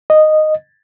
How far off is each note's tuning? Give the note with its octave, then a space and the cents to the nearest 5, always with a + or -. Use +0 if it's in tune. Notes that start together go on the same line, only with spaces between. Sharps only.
D#5 -10